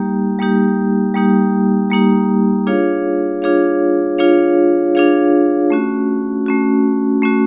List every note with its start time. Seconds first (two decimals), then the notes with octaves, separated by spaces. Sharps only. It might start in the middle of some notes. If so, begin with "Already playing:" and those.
Already playing: G3 A#3 D#4 G4
0.39 G3 A#3 D#4 G4
1.14 G3 A#3 D#4 G4
1.90 G3 A#3 D#4 G4
2.67 D4 F4 G#4 C#5 F5
3.42 D4 F4 G#4 C#5 F5
4.18 D4 F4 G#4 C#5 F5
4.95 D4 F4 G#4 C#5 F5
5.70 A3 C#4 F#4
6.46 A3 C#4 F#4
7.22 A3 C#4 F#4